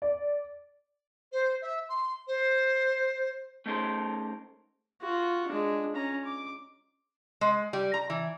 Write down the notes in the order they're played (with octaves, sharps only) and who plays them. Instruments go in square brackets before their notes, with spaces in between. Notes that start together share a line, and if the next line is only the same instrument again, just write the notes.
[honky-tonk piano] D5
[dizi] C5
E5
C6
C5
[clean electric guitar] A3 C#4 D#4 G#4 A#4 C5
[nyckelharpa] F4 F#4
G#3 D4
C#4 A#5
D6
[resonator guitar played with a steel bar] G#3
G3
A#5
E3